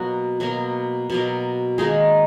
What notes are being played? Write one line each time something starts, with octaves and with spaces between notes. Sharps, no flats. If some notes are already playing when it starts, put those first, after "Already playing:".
Already playing: B2 F#3 A#3 F#4
B2 F#3 A#3
B2 F#3 A#3
D#3 G#3 A#3 D#4 G#4